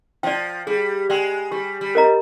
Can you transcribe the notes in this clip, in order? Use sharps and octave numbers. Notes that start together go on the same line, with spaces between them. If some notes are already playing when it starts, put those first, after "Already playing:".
F3 D5 G5
G3 G#4
G#3 D5 G5
G3 G4
G3
A#4 D#5 A#5